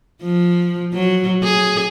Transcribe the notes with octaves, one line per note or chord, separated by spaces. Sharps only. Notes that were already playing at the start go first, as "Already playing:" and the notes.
F3
F#3
G#4